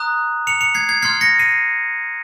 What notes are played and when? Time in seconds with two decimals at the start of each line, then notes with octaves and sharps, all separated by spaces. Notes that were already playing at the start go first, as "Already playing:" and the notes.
Already playing: A#5 D#6 F#6
0.47 C#7 F7
0.61 C#7 F7
0.75 G#6 C7
0.89 G#6 C7
1.02 C6 F6 G#6 C7
1.21 A#6 C#7
1.39 C7 D#7